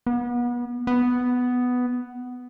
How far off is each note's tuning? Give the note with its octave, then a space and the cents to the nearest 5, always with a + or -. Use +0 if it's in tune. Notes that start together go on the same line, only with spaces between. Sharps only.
B3 -30
B3 +5